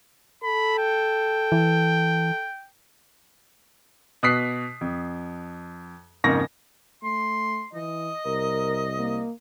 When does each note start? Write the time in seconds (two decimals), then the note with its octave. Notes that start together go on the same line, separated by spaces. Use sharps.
0.43 A4 B5
0.78 G5
1.52 E3
4.23 B2 D#6 F#6 B6 C7
4.81 F2
6.24 F2 G#2 C#3 A#3 C#6 A#6
7.03 A3 C6
7.73 E3 D#5
8.26 C2 A#4
8.98 A#3